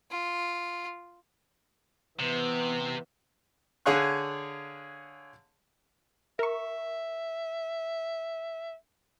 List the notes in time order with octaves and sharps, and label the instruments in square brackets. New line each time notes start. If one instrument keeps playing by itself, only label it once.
[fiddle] F4
[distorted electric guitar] C3 [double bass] E3 B3
[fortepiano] D3 G#4 C#5 F5 C#6 F#6
[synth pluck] A#4 C#6 [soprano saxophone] E5